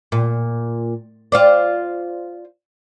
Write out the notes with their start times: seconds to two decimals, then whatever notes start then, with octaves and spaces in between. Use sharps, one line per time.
0.12 A#2
1.32 F4 C5 D5